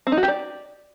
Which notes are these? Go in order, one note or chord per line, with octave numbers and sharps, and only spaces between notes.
C4
D#4
F#4
G4
D5